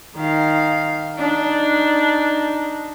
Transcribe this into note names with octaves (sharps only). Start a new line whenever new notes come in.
D#3 F5
D4 D#4